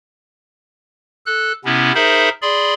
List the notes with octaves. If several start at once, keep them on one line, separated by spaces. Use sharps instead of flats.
A4 F#6
C3 B3 C#4 E4
D#4 G#4 A#4 C5 E5 B5
G#4 D5 B5 C6